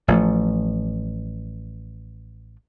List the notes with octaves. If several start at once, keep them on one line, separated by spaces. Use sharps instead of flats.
A1 F3 G3 A3